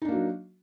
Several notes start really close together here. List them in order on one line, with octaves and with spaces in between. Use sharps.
D#4 D4 A#3 F#4 F#3